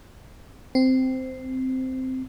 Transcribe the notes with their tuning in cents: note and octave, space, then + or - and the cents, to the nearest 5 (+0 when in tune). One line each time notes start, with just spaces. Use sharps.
C4 -10